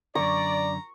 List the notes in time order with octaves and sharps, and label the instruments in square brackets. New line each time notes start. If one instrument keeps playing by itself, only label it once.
[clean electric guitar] F#2 D3 [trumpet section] D5 [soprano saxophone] A#5 [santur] C#6